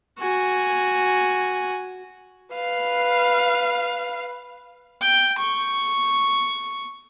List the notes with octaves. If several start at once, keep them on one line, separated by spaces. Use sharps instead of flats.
F#4 G#5
B4 F5
G5
C#6